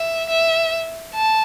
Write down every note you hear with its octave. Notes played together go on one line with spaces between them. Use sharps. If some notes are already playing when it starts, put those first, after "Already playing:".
Already playing: E5
E5
A5